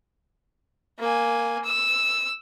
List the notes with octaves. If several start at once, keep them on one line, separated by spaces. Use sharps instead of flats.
A#3 G#5
E6